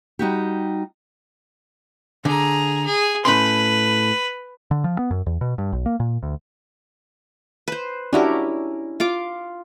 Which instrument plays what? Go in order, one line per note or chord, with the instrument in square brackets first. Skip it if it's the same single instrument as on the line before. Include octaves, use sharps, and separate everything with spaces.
[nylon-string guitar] G3 D#4 F#4 G4
[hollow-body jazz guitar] D3 [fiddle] G#4 A#5
[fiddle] G#4
[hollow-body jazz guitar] A2 C#4 C6 [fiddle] B4
[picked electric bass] D3
F3
B3
F#2
E2
B2
G2
B1
A#3
A#2
D2
[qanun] B4 C5
[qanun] C#4 E4 A#4 [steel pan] D4 F#4 G4
[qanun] F4 F5 D6